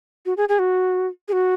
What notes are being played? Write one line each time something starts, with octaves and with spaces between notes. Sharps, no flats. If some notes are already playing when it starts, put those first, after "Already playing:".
F#4
G#4
G#4
F#4
G#4
F#4